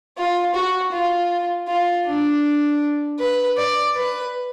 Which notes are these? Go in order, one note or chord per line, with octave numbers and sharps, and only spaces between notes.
F4
F#4
F4
F4
D4
B4
D5
B4